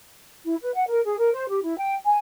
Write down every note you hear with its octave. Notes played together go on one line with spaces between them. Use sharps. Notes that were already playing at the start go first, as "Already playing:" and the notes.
E4
B4
F#5
A#4
G#4
A#4
C5
G4
E4
G5
G#5